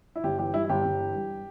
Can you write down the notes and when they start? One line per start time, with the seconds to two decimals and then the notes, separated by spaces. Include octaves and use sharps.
0.16 E4
0.24 G1 G4
0.39 E3 G4
0.54 G2 E4
0.64 E4
0.69 G1 G4
0.85 G1
0.99 E3
1.14 G2